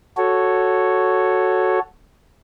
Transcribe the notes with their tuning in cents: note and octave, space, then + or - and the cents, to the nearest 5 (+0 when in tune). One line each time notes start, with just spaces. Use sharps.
F#4 +0 A4 +0 C#5 +0